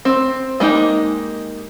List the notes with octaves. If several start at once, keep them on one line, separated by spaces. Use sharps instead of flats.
C4
G#3 A#3 D#4 G4